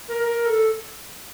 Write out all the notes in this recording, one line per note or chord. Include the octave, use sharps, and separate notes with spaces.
A#4
A#4
A4